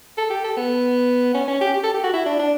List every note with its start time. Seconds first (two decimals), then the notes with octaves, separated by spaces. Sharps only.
0.18 A4
0.30 G4
0.44 A4
0.57 B3
1.34 C#4
1.48 C#4
1.61 G4
1.74 G4
1.84 A4
1.94 G4
2.04 F#4
2.13 E4
2.26 D4
2.39 D4